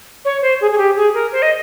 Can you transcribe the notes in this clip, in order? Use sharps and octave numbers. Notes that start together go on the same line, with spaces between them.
C#5
C5
G#4
G#4
G4
G#4
A#4
C5
D#5